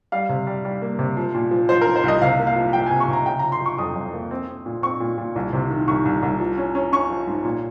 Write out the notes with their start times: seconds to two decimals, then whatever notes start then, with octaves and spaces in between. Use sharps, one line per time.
0.12 G3 F5
0.29 C3
0.47 G3
0.65 G3
0.82 A#3
0.99 C3
1.17 F3
1.35 A#2
1.51 F3
1.69 F3 C5
1.81 A#4
1.87 F3
1.96 C5
2.04 C2 D#5
2.22 C3 F5
2.39 A#3
2.47 F5
2.56 F3
2.73 F3 G5
2.86 G#5
2.91 C3
3.00 C#6
3.08 C3 A#5
3.26 C#3 G5
3.39 F3 A#5
3.52 C6
3.61 F3 C#6
3.78 F2 D#6
3.96 F2
4.13 A#3
4.31 C4
4.48 C4
4.66 A#2
4.83 C4 C#6
5.00 A#2
5.18 A#2
5.36 C2
5.53 C3
5.70 D#3
5.88 C2 C#6
6.05 C2
6.23 C2
6.40 F3
6.58 C#4
6.75 C#4
6.92 C#4 C#6
7.10 F3
7.27 G#2
7.45 A#2